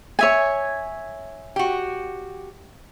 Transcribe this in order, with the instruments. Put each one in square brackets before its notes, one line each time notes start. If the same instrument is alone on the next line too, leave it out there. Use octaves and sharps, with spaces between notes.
[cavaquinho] C#5 E5 G#5
[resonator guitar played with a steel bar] F#4 G4